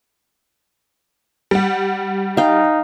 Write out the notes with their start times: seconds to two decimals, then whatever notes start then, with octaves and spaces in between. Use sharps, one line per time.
1.51 G3 F#5
2.37 D#4 F5 G5